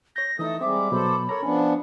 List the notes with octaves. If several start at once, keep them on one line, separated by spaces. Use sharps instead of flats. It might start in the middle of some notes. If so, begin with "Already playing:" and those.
C#5 G6 A#6
E3 A3 D#4 A4 D#6
G3 G#3 C4 E5 D6
B2 F#3 B3 A4 C5 B5
A4 A#4 C#5 A#5
F3 B3 C#4 D4 G#5